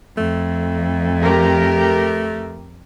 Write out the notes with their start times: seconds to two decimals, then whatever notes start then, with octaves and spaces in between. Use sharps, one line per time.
0.17 F2 A3
1.21 G4 A#4